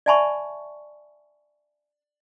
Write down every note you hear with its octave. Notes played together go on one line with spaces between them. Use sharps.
D5 E5 G#5 A5 B5 C#6